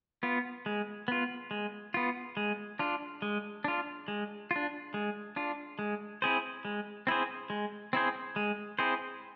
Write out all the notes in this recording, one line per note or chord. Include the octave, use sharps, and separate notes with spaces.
B3 F4
G#3
B3 F4
G#3
B3 F4
G#3
D4 F4
G#3
D4 F4
G#3
D4 F4
G#3
D4 F4
G#3
C4 E4 G#4 C5
G#3
C4 E4 G#4 C5
G#3
C4 E4 G#4 C5
G#3
C4 E4 G#4 C5